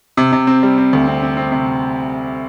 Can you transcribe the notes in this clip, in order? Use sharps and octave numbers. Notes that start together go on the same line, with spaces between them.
C3
C3
C4
G3
C4
D2
C4
C4
C4
C3